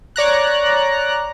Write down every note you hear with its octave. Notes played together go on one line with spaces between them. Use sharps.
C#5 D5 A#5 F#6